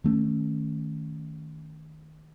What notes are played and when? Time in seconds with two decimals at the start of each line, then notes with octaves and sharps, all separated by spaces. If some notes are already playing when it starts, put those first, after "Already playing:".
0.04 D#3 A3 C#4